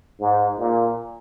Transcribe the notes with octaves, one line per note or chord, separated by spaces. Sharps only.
G#2
A#2